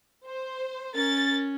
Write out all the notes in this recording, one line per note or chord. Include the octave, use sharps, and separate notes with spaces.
C5
C#4 A#4 A6